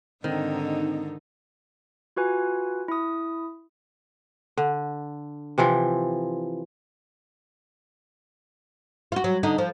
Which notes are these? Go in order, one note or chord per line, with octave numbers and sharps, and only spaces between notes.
G#2 D3 D#3 C4 D#4
F4 F#4 B4 G#5
E4 D#6
D3
C3 E3 F3 E4
F4 F#4
F#3
D3 D#4
F3